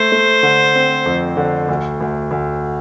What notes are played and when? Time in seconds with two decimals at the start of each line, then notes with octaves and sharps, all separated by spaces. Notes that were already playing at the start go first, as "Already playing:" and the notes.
Already playing: A3 C5
0.12 A3
0.43 D3
0.75 C4
1.06 F2
1.37 D3
1.69 D2
2.01 D2
2.31 D2